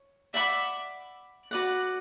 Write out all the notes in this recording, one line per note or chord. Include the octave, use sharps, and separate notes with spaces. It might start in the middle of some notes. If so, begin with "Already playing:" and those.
Already playing: C#5
D5 E5 F#5 B5 D6
F#4 B4 D5 F#5